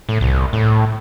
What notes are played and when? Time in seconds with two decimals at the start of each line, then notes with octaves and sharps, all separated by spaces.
0.09 A2
0.21 C2
0.53 A2